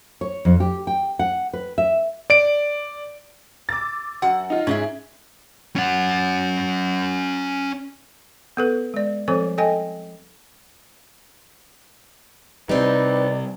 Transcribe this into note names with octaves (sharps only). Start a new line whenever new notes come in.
C#5
F2
G4
G5
F#5
B4
E5
D5 D7
D6 E6 A6
F#2 F#4 F#5
D#4 F4
G#2 C#4 G#4 E5
C#4 F#5
B3 A4 B4
G#3 D5
F3 G3 C4 A4 C5 C#5
A4 D#5 G5 G#5
C3 G3 C4 D#4 B4 D5